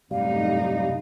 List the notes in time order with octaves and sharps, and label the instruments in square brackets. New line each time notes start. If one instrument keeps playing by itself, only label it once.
[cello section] F#2 A2 D#4 [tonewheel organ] C3 G3 [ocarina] F5